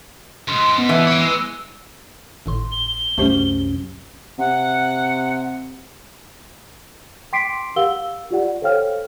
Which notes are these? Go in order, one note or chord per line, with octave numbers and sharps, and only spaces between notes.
C#2 G#2 C6
B3
E3
C#5 G5
G#3 E6
G#1 A2 C6
G7
C2 F#2 A3 C#4 G4 C5
C3 F#5
G5 C6 D6 B6 C7 D7
G4 A#4 F5 F#5 E6 G7
F4 G4 D5 F#5
A4 C5 C#5 F5 G5 F6